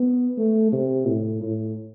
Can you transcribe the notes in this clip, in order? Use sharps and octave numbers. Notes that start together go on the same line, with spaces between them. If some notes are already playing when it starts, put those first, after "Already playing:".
Already playing: B3
A3
C3
A2
A2